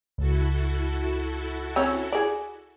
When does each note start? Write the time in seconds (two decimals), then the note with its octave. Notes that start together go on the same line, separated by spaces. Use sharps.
0.18 C#2 E4 F#4 A4
1.76 C4 C#4 C#5
2.12 G#4 D5